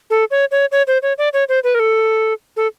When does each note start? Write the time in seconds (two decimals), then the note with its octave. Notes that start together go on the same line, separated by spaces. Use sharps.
0.10 A4
0.31 C#5
0.51 C#5
0.72 C#5
0.87 C5
1.02 C#5
1.18 D5
1.33 C#5
1.49 C5
1.64 B4
1.75 A#4
1.80 A4
2.57 A4